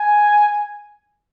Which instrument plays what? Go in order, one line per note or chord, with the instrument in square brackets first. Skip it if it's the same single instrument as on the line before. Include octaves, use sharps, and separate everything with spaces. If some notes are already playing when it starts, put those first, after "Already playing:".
Already playing: [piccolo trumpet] G#5